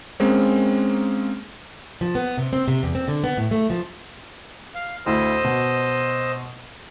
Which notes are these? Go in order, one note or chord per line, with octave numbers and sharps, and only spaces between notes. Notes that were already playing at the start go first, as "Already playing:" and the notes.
G#3 A#3 C4 C#4
F3
B3
C3
C4
C3
E2
C4
D3
B3
A2
A3
F3
F5
D2 E4 C5 D#5 E6
B2